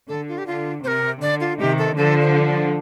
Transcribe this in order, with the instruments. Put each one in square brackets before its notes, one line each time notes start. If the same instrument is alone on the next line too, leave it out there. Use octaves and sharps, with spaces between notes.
[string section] D3 [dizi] A4
[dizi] F4
G4
[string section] D3 [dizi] F4
[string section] C3 [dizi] C5
[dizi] A#4
[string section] D3 [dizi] D5
[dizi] F4
[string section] C3 D#3 [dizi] G4
[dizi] A4
[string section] D3 F3 [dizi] A4
[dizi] C5
D5